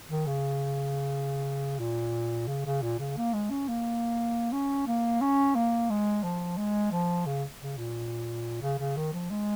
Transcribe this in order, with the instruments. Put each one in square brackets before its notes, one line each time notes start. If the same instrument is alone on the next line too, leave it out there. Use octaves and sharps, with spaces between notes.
[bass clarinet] D#3
C#3
A#2
C#3
C#3
A#2
C#3
A#3
G#3
C#4
A#3
C#4
A#3
C#4
A#3
G#3
F3
G#3
F3
C#3
C#3
A#2
C#3
C#3
D#3
F3
G#3